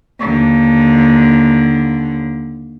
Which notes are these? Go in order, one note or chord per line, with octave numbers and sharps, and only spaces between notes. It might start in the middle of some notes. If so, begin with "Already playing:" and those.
D#2 D3